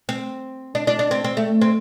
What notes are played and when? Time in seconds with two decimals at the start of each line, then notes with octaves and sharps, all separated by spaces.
0.09 C4
0.75 D4
0.87 D4
0.99 D4
1.11 C4
1.24 C4
1.37 A3
1.62 C4